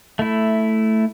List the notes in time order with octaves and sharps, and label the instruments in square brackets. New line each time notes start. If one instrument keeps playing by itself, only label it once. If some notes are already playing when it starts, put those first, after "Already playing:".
[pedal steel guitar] A3 E4